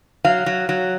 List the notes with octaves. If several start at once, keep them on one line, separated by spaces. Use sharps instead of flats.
F#3 F5
F#3
F#3